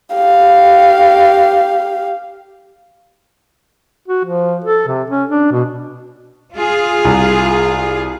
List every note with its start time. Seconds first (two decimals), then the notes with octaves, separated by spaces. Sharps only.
0.15 G4 F5
4.08 F#4
4.25 F3
4.64 A4
4.88 C3
5.10 C#4
5.29 D4
5.51 B2
6.53 F4 G#4
7.05 C2